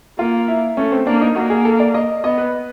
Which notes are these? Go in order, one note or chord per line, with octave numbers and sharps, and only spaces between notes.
A#3 F4
E4
A3 C#4
C4
A#3 D4
D#4
A#3 F#4
G#4
A4
D5
D#5
B3 D#5
B4